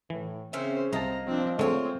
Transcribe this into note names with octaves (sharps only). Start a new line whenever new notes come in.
A2 E3
C#3 C4 C#4 C5 E5
C2 A#3 C4 D#5 A5 A#5
F3 C4 D4
D3 G#3 A3 C4 F4 C#5